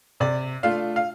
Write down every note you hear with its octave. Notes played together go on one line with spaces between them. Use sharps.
C3 D5
A3 D4 F4 F5
F5